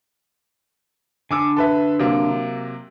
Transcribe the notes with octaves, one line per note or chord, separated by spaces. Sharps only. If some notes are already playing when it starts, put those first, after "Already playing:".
D3 G#5 D6 E6
A4 B4 E5
C3 F#3 A#3